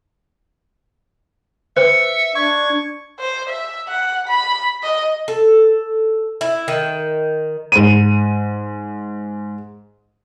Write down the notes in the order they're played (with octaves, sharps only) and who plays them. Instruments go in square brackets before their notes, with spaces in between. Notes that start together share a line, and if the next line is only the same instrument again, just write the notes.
[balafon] B4 C5 [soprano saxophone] E5 [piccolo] C#7
[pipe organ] D4 [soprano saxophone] C#6 [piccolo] G#6
[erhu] C5
E5
F#5
B5
D#5
[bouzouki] A4
E4
D#3
[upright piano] G#2 D#7